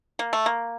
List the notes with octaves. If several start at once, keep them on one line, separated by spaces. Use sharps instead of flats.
A#3
A3
A#3